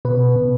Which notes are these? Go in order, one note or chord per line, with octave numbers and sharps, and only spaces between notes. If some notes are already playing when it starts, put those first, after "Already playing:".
B2 B4
B2